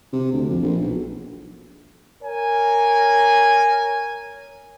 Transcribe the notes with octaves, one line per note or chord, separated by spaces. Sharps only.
C3
D2
F2
A#1
B1
A#4 C#5 G#5